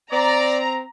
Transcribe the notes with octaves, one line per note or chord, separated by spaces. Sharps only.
C4 D5 A#5